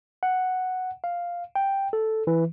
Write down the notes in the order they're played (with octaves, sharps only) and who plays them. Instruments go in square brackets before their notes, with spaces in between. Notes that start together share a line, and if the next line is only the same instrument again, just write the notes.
[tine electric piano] F#5
F5
G5
A4
E3